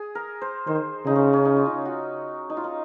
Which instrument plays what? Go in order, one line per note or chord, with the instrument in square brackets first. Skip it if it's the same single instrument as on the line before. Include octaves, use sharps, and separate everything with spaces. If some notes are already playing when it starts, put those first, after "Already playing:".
Already playing: [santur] G#4
A#4
C5
[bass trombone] D#3 [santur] C5
[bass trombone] C#3 [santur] D#4
[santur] C#4
C#4
D#4
F4
D#4
F#4
D#4
F4
D#4